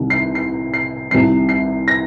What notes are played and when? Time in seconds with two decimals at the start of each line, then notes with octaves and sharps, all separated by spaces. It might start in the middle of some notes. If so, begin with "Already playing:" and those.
Already playing: C2 C3 D#3
0.10 C7
0.35 C7
0.74 C7
1.11 C2 C3 D#3 C7
1.49 C7
1.88 A#6